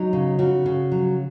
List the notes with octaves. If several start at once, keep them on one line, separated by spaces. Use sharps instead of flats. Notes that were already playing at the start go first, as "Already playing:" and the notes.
Already playing: F#3 D#4
C#3
C#3 F#4
C#3
F#3